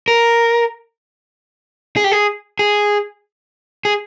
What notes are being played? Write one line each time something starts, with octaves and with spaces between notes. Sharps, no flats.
A#4
G#4
G4
G#4
G#4
G#4